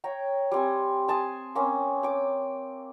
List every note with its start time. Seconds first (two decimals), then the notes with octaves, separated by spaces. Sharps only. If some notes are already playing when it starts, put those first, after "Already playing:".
0.04 C#5 G5 A#5
0.52 G3 C4 G#5
1.08 G#5 A5 C6 D#6
1.55 A#3 C4 C#4
2.03 G5 D6